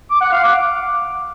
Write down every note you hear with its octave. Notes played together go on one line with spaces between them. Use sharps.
D6
F#5
F5
D6